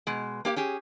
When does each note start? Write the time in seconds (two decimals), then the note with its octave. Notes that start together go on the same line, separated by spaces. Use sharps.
0.07 B2 G#3
0.45 A#3 G4 D5 F5
0.56 C#4 G4 G#4